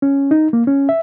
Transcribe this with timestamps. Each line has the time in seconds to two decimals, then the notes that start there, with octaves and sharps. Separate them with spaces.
0.02 C#4
0.31 D#4
0.53 A#3
0.67 C#4
0.89 E5